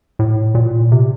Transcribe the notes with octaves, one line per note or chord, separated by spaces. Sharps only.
A2
A#2
C3